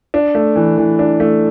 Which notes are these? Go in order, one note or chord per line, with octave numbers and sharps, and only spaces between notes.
D4
A3
E3
E3
D4
A3